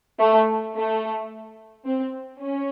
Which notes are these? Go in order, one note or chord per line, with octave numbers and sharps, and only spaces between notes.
A3
A3
C4
C#4